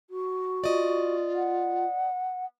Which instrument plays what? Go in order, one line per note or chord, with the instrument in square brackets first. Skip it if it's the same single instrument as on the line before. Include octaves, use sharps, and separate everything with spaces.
[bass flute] F#4
[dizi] F4 [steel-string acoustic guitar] D5 D#5
[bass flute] F#5